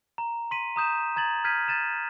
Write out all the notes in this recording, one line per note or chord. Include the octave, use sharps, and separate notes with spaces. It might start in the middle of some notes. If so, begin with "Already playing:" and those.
A#5
C6 B6 D#7
A#5 D#6 G6 E7
A#5 G#6 A6 F#7
F6 G6 G#6 B6 D#7
G6 A6 D#7 E7